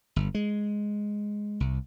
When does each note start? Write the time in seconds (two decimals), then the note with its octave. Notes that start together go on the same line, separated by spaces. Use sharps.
0.16 G1
0.35 G#3
1.60 C2